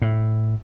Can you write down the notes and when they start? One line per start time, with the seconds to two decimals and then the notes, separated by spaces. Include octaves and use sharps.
0.02 A2